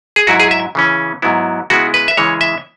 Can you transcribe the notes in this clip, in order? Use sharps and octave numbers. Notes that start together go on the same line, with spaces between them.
G#4
G#2 F#3 E4 F#4
G#4
E5
C#3 E3 C#4
G#2 F#3 B3 E4
C#3 G#3 B3 E4 F#4
B4
E5
C#3 E3 G#3 C#5
E5